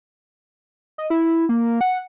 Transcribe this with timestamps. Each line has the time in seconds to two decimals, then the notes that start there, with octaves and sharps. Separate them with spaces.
0.98 D#5
1.10 E4
1.49 A#3
1.81 F#5